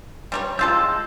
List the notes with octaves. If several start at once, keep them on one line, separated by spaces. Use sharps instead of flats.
G3 A#4 C#5
G3 G#3 F4 A4 E6 G6